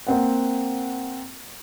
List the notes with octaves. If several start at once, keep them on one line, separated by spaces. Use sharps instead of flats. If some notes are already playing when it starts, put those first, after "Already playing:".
A#3 C4 F#5